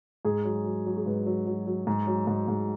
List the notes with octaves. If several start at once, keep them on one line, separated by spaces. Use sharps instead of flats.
G#2 G#4
F#3
F#3
F#3
G#4
G#2 B4
F#3
F#3
F#3
G#2
F#3
G#2
G#2